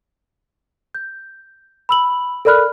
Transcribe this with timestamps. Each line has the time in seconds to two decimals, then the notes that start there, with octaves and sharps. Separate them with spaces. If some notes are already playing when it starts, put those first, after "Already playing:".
0.95 G6
1.89 B5 E6 F#7
2.45 A4 A#4 D5 B5 F6 F#6